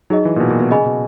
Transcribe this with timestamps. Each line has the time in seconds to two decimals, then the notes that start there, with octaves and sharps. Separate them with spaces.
0.10 F#3 D#4 G#4 D#5
0.25 E3
0.36 A#2
0.40 B2
0.50 A#2
0.60 B2
0.71 C#3 G#4 D#5 G#5 B5
0.86 B2